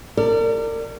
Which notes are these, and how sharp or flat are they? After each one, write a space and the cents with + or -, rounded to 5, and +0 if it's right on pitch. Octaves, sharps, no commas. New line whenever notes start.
A#4 -40 D5 +5